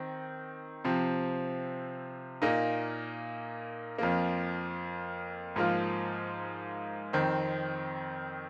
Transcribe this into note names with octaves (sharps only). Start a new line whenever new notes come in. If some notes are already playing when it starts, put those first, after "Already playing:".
Already playing: D#3 C4
C3 F3 C4
A#2 A#3 D#4
F2 F3 A#3
G#2 F3 A#3 F4
F2 D#3 C4